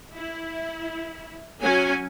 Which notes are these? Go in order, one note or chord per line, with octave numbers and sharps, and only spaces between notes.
E4
F#3 C#4 G#5